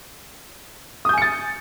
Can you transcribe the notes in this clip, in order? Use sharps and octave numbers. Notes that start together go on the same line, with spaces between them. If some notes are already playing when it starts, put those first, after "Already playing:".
G#5 D#6 G6 A6 C#7